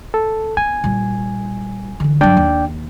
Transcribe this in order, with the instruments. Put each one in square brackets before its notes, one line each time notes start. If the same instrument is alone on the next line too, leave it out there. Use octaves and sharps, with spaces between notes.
[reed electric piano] A4
[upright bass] B3 [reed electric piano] G#5
[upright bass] A#2 G3
D3 E3
[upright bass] G2 F#3 [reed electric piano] D4 D5 G5
[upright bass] D#2